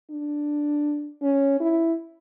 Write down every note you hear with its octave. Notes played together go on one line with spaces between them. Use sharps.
D4
C#4
E4